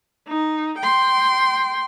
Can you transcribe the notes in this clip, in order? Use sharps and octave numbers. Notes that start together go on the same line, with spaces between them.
D#4
G5 C6